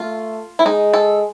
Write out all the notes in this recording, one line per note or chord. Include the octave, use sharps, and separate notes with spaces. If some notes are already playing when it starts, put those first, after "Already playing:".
Already playing: A3 F4
E4
G#3 D#4
A4